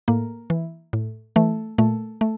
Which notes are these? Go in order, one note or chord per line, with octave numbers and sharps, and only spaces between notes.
A2 A#3
E3
A2
E3 A3
A#2 A3
A3